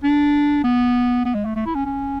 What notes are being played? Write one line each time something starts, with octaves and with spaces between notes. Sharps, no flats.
D4
B3
B3
G#3
A3
A3
E4
C#4
C#4